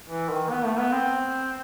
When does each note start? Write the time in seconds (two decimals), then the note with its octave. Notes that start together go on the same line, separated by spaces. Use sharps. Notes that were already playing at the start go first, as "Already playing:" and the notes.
0.07 E3
0.30 D#3
0.50 B3
0.65 A3
0.78 B3
0.92 C4